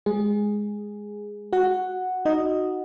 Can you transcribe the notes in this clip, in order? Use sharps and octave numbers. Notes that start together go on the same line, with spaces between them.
G#3 G#4
F#4 F#5
D#4 D#5